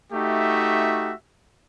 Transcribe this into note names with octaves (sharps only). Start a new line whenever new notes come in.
A3 D#4 F#4 G4 E5